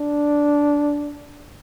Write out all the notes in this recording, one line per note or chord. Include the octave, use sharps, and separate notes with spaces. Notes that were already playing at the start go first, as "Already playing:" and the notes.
Already playing: D4